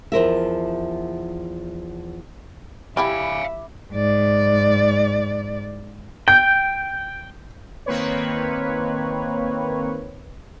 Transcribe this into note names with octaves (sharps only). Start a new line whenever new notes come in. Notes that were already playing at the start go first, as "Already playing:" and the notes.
E2 F3 A#4 E5
G3 E4 G4 E5 F5 G#5 B5 D6
G#2 D5
G5 G6
D#3 A#3 C4 B4 C#5